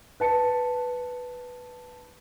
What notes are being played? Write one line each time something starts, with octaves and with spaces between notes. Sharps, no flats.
B4 A5 C#7